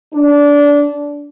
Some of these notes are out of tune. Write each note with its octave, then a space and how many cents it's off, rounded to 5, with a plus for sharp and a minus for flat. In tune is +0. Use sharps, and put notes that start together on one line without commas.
D4 -20